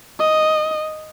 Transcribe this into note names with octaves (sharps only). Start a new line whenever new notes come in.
D#5